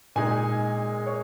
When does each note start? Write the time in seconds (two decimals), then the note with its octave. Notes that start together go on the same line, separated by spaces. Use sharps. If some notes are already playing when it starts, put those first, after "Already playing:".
0.16 A#2 G#3 D#4 G#5
1.06 C#5